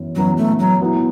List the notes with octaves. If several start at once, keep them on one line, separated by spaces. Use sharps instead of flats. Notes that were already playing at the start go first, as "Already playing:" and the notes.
Already playing: F#2 E3 B3
F#2 E3 F#3 B3
A3
F#3
F#3 B3 E4